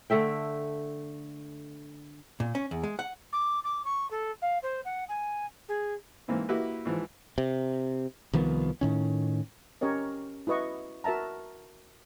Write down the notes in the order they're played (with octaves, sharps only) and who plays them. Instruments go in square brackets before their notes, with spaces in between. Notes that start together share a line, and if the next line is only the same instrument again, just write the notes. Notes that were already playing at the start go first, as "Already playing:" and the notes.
[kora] D3 A3 E5 G5
[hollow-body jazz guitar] A#2
C#4
E2
G#3
F#5
[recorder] D6
D6
C#6
A4
F5
C5
F#5
G#5
G#4
[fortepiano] G#2 E3 A#3 C4
A#3 E4 F#4 G4 B4
G#2 E3 F3
[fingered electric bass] C3
C2 D#3 F3 B3
A2 D#3 C#4
[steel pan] C#4 G4 A#4 C#5 D#5
E4 F#4 B4 D#5 C#6
F#4 A#4 E5 A5 A#5